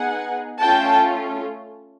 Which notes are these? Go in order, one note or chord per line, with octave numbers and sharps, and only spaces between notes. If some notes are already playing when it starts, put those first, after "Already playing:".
Already playing: B3 D#4 G#4 F#5 G#5
A3 C#4 F4 A4 G5 A5